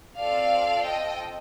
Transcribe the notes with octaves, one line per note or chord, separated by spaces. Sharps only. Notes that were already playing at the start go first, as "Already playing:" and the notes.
C4 F4 A4 D5 F5
D#5 G5